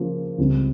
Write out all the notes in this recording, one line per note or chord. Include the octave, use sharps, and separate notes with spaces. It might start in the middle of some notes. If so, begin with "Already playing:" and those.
Already playing: C#3 F3 A#3 F4
C#2 C#3 G3 C4 F4